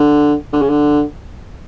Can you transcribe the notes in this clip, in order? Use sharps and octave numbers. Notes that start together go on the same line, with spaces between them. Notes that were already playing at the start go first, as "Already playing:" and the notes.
Already playing: D3
D3
C#3
D3